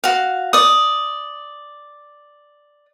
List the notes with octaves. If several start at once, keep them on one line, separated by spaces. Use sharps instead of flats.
F#4 F5
D5 D#6